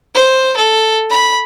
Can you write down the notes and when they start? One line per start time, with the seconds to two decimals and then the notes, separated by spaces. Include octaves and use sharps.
0.15 C5
0.57 A4
1.10 B5